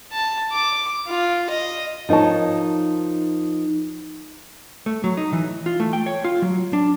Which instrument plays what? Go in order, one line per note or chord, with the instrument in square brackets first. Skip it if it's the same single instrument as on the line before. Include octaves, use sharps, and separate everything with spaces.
[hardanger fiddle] A5
D6
F4
D#5
[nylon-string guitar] F3 D#4 A#4 C#5 A5
[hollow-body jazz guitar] A3
F#3
D#4
E3
F4
A3
G5
C#5
F4
F#3
D4